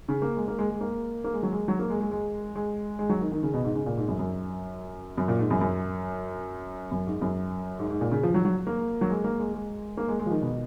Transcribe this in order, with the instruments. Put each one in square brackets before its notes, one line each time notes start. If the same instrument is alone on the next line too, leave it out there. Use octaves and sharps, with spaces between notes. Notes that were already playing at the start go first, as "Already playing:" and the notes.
[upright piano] C#3
A#3
G#3
A#3
G#3
G#3
A#3
A#3
G#3
F#3
G#3
F#3
A#3
G#3
G#3
G#3
G#3
G#3
F#3
D#3
D#3
C#3
B2
G#2
C#3
A#2
G#2
F#2
F#2
F#2
A#2
G#2
F#2
F#2
F#2
G#2
F#2
G#2
G#2
A#2
C#3
F3
F#3
F#3
A#3
F#3
G#3
A#3
G#3
G#3
A#3
G#3
G#3
F3
D#3
B2